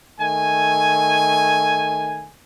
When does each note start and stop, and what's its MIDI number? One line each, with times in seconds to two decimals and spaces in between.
0.19 2.29 51
0.19 2.29 57
0.19 2.29 80